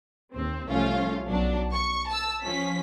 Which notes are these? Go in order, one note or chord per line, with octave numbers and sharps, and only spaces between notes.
D#2 C4
C2 F3 A3 C#4 F4 F5
B1 F#3 D4
C#6
A5 E6
F3 C#4 B6